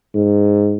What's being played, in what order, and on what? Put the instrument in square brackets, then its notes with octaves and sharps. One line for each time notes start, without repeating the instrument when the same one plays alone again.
[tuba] G#2